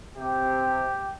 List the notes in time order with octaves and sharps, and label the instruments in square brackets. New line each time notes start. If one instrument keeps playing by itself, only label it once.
[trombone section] C3 [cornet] G4